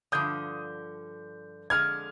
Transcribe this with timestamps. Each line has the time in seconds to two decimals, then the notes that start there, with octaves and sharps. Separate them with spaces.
0.12 G2 D3 F3 D#6 G6
1.70 F2 D3 G#3 F6 G#6